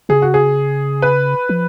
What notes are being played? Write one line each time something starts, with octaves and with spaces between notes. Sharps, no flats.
C#3 G#4
F#4
G#4
B4
F3